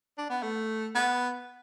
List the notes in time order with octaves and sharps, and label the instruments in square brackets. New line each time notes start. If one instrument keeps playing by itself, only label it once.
[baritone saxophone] D4
B3
A3
B3